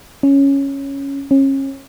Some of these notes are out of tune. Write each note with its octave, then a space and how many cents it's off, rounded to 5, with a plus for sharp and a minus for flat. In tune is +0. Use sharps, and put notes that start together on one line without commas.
C#4 +0
C#4 -30